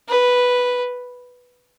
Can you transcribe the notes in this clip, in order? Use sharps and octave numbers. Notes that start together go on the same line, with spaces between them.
B4